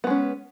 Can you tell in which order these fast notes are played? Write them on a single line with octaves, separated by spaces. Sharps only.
B3 G#3 C#4